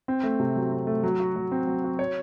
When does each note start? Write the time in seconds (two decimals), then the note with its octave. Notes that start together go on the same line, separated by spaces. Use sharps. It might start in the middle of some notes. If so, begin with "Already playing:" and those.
0.08 C4
0.23 A3
0.40 C3
0.56 F#3
0.72 C4
0.87 A3
1.03 F#3
1.20 F#4
1.36 F#3
1.52 C4
1.67 F#3
1.84 F#4
1.99 C#5